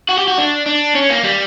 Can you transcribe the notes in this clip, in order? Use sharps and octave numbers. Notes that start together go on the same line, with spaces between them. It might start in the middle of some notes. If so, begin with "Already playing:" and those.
F#4
G4
F#4
D4
D4
C#4
A#3
G3